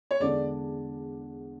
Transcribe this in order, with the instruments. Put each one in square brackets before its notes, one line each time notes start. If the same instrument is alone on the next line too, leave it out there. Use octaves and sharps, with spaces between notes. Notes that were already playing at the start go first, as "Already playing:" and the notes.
[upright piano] C#5
[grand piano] E2 D3 G#3 D4 [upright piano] D5